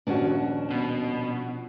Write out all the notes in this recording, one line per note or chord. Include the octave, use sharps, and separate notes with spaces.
D#1 F3 C#4 D4 F#4
B2